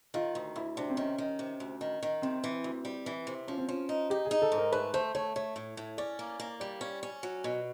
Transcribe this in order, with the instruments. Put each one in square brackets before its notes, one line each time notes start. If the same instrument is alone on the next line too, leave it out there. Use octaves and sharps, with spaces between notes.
[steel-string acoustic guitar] D#3 [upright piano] F4
[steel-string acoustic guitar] D2
[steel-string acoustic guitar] D2 [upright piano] E4
[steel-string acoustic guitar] C3 [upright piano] D4
[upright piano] C4
[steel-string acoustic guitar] D#3 [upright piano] C#4
[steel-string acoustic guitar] D#3
C3
D2
D#3
D#3
[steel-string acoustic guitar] C3 [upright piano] C4
[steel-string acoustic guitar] E3
D2
G3
E3
C3
[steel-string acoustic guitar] F3 [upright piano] C#4
[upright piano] C4
[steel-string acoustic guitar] F3 [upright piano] C#4
[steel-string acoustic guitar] D#4
[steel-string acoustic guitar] D#4 [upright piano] G4
[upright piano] G#4
[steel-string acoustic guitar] D#4
[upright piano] A4
[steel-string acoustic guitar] G#2
[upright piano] A#4
[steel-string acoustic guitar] A3 [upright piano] B4
[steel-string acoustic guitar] A3 [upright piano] C5
[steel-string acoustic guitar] A3 [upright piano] C#5
[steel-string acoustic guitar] A3 [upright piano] C#5
[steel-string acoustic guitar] A2
A2
[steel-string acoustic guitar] C#4 [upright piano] D5
[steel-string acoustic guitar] A#3
A#3
[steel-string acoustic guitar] G3 [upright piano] D5
[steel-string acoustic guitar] C#4
C#4
F#3
B2